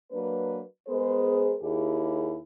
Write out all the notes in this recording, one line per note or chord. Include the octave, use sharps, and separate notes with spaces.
F#3 A#3 D4 B4
G#3 B3 G#4 A#4 C5
D#2 E4 G4 G#4